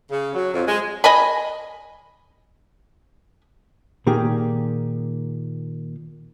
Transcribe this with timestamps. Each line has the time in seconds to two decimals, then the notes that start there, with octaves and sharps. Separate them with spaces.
0.11 C#3
0.35 F#3
0.53 F2
0.67 G#3
1.04 D#5 G#5 B5
4.07 A#2 D#3 A#3 G4 G#4